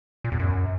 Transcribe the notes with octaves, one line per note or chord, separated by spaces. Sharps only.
A#2
E2
F#2